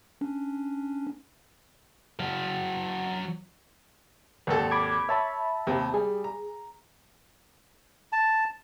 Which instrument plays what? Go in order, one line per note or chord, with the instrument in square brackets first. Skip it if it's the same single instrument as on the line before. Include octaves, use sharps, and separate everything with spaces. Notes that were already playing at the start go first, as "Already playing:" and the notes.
[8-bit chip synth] C#4 D4
[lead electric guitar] F#3 F5
[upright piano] G#1 D#2 A4
[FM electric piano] B5 D6 G#6
[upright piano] C#5 [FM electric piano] E5 A5 B5
[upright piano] D#2 C3
[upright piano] G3 [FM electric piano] G#4
[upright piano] A#5
[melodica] A5